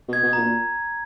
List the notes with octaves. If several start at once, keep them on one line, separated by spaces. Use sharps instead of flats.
B2 G#6
B2
A#5
A#2